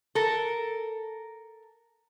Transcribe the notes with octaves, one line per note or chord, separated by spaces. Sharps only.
A4 A#4